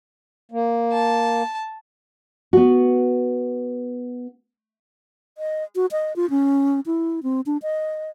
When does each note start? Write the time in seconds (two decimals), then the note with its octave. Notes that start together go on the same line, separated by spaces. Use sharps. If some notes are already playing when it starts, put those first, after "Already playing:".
0.51 A#3
0.93 A5
2.53 B3 F#4
5.38 D#5
5.76 F#4
5.91 D#5
6.16 F4
6.30 C#4
6.86 E4
7.23 C4
7.46 D4
7.62 D#5